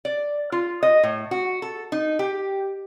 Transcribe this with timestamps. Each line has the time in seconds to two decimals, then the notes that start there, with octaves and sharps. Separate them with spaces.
0.05 D5
0.52 F4
0.83 D#5
1.03 A2
1.31 F#4
1.62 A4
1.92 D#4
2.19 G4